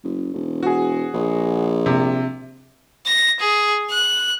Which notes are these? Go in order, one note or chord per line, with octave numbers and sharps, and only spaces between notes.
F#1
E1
F#4 G#4
A#1
C3
A#6
G#4
F#6